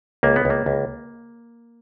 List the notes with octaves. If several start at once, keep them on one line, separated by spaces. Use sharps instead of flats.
C#2 A#3
B3
C#2
A#3
C#2